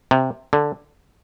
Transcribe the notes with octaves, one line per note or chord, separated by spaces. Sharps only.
C3
D3